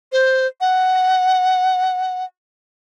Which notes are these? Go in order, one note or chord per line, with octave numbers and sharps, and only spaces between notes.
C5
F#5